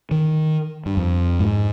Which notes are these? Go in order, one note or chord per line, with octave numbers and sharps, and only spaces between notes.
D#3
G2
F2
G#2